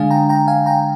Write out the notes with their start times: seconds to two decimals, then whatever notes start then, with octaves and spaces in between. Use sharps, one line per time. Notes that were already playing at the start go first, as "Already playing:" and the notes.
Already playing: D3 G#3 D4 F5 G#5
0.11 G5 A#5
0.29 G5 A#5
0.48 F5 G#5
0.66 G5 A#5